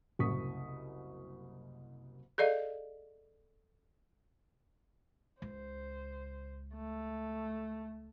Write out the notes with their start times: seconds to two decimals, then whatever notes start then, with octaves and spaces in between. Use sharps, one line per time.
0.19 F#1 C2 F#2 C#6 D#6 B6
2.38 G#4 A4 D5 D#5 F5
5.42 C#2 C5
6.75 A3